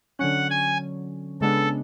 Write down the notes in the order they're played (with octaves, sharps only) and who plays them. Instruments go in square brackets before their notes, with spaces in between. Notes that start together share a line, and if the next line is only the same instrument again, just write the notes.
[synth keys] D3 F#3 C#4 [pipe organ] F#5
[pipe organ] G#5
[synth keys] C#3 G#3 B3 D4 [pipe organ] A4